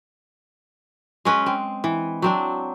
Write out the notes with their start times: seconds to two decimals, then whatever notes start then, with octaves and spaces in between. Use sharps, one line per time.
1.25 G#3 C#4 B4
1.46 C4
1.84 E3
2.22 F#3 C4 D4